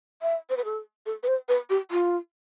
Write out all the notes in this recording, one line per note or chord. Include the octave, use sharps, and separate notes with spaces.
E5
C5
B4
A4
A4
B4
C5
B4
G4
F4